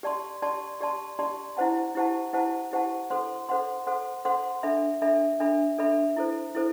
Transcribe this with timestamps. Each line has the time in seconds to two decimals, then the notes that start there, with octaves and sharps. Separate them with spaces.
0.03 G4 D5 A5 C6
0.42 G4 D5 A5 C6
0.80 G4 D5 A5 C6
1.19 G4 D5 A5 C6
1.57 E4 G4 C5 F#5 A5
1.95 E4 G4 C5 F#5 A5
2.33 E4 G4 C5 F#5 A5
2.71 E4 G4 C5 F#5 A5
3.10 A4 C5 F#5 C6
3.49 A4 C5 F#5 C6
3.87 A4 C5 F#5 C6
4.25 A4 C5 F#5 C6
4.63 D4 A4 E5 B5
5.02 D4 A4 E5 B5
5.40 D4 A4 E5 B5
5.78 D4 A4 E5 B5
6.16 E4 A4 C5
6.55 E4 A4 C5